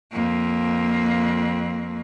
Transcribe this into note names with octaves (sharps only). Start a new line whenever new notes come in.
F2 A#3